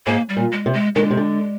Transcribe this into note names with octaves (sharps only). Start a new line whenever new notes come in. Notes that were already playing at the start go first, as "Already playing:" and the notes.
G#2 A#3
G3
A#2
G#3
C3
G#3
D#3 G#3
D3
C3
D3